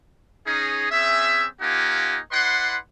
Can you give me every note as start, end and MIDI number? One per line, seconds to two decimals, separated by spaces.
0.47 0.86 61
0.47 0.86 63
0.47 0.86 68
0.90 1.46 60
0.90 1.46 61
0.90 1.46 68
0.90 1.46 76
1.61 2.18 58
1.61 2.18 63
1.61 2.18 65
1.61 2.18 67
1.61 2.18 78
1.61 2.18 80
2.32 2.77 64
2.32 2.77 71
2.32 2.77 74
2.32 2.77 78
2.32 2.77 84